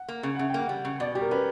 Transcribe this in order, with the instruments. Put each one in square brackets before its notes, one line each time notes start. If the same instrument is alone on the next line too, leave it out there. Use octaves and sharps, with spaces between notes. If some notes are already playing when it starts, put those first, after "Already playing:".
Already playing: [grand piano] F#5
[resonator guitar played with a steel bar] A#3
C#3
[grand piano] F#5
[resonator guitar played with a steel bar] C#3 [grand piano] E5
[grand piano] G5
[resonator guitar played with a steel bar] A#3 [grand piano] F#5
[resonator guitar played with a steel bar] G3
C#3
[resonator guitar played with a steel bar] B2 [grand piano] D5
[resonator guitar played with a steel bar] G3 [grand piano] G4
[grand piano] A#4
[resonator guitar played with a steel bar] C#4 [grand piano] B4